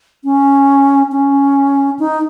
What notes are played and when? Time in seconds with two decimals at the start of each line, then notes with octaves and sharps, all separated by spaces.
0.24 C#4
1.12 C#4
1.99 D#4